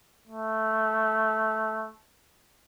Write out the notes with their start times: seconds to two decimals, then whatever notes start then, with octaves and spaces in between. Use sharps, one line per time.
0.28 A3